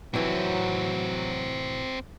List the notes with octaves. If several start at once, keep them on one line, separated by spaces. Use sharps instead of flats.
A2 C3 E3 F#3 C4 F#4